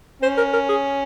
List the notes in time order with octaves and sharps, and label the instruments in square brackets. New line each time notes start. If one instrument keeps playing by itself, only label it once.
[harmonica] C#4 [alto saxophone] C5
[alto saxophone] A#4
A#4
G#4